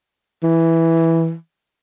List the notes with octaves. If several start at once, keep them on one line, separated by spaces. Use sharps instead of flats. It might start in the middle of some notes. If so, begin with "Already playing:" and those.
E3